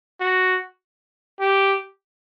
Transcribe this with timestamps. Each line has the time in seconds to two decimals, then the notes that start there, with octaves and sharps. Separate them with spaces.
0.21 F#4
1.40 G4